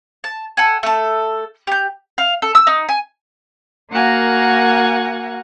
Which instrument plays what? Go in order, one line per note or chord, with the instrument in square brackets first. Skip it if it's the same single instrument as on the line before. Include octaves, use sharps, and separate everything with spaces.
[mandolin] A5
A4 F#5 G#5
A3 A4
G4 G6
F5
A4
E6
D#4
G#5
[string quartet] A#3 F#4 A#4 F5 F#5 G#5